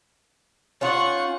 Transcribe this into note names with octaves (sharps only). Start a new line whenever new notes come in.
C#4 D#4 F4 F#5 C#6